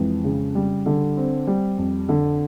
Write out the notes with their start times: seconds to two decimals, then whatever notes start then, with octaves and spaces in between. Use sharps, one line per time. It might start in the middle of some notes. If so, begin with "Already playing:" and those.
Already playing: F2 E3 G#3
0.24 C#3
0.55 G3
0.86 D3
1.17 C4
1.47 G3
1.78 F2
2.09 D3